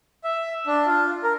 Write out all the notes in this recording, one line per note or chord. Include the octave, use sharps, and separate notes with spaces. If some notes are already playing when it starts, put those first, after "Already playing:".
E5
D4
F4
A#4